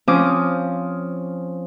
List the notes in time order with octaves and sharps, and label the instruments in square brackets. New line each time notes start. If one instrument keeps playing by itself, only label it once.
[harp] F3 C4 C#4 F4 D6 D#6